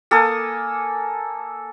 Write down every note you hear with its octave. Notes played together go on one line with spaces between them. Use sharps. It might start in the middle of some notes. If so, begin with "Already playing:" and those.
A#3 A4 G#5 D#6